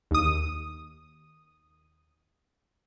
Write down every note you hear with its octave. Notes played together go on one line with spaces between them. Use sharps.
D#2 D#6